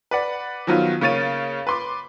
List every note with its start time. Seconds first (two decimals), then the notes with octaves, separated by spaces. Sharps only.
0.11 B4 D5 F#5
0.67 D#3 F3 F#3 B3 F4
1.01 C#3 A#3 C#5 A6 D#7
1.67 B4 C6 D6